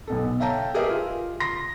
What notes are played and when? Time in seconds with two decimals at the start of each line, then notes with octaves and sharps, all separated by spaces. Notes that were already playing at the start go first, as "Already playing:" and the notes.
0.07 B1 B2 A4
0.40 C#5 E5 F5 G5 A5 A#5
0.74 G4 G#4 A#4 B4 D#5 E5
0.91 F4
1.40 C6 A#6